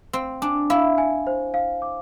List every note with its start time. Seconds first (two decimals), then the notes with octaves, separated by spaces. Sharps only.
0.13 C4 F5
0.42 D4 G#5
0.70 E4 F5
0.98 G#5
1.27 C5
1.54 F5
1.82 D6